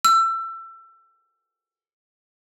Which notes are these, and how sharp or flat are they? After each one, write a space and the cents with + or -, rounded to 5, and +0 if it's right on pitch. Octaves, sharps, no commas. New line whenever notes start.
E6 +25